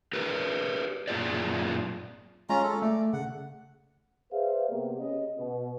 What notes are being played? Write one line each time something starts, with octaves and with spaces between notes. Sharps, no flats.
G4 A#4 B4
F#2 A#2 C#3 F4 G#4 D5
G#3 C#4 F4 A#5
A4
A3 D5
C#3 F#5
G#4 B4 C5 D5 E5 F5
C3 A#3 B3 G4
C#3 D#5
B2